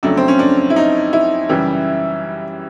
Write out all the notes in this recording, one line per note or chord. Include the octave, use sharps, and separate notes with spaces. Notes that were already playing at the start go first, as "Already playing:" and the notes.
F2 C#3 F#3 A3 D4
C4
C#4
D4
E4
D#4
E4
F#2 C#3 E3 G3